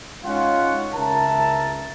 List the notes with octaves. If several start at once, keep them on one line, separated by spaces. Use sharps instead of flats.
G#3 C#4 D#4 F4 F5 F#5
C#2 A#4 E5 A5